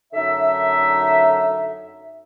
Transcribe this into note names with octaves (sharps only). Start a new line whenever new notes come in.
F#2 D3 D#4 E5